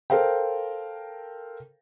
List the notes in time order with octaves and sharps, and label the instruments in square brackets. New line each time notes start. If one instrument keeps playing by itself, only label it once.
[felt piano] A4 A#4 C5 F5 G5